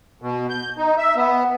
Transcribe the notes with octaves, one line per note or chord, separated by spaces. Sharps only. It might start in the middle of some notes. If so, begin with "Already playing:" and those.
B2
G6
D#4
E5
B3